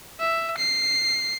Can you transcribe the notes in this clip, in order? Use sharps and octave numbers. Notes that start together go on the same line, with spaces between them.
E5
C7